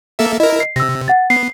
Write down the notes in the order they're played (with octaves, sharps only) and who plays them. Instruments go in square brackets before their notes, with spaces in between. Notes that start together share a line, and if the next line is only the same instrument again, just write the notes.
[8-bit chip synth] A#3 A4 E5
[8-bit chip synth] E4 A#4 [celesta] D#5
[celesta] C7
[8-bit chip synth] C3 [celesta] E6 A#6
[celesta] F#5 A6
[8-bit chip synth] B3 [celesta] C7